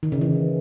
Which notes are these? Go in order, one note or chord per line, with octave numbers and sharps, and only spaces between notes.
D#3
C#3
E3